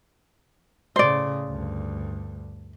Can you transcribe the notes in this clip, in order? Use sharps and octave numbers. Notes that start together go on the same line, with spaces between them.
A2 C#3 C5 D5
D2 G2